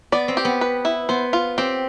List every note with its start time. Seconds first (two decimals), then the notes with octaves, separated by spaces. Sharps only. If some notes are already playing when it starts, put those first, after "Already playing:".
0.12 B3 D5
0.28 C4
0.37 G4
0.45 B3
0.61 B4
0.85 E4
1.09 B3 C5
1.33 F4
1.58 C4 G4